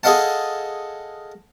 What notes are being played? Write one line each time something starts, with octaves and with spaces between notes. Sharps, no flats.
G#4 A4 D#5 F5 F#5 A5